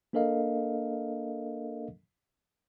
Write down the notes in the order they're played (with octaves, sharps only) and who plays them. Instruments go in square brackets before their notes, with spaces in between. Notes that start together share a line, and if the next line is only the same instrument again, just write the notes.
[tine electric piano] A#3 D4 A4 A#4 D#5 F5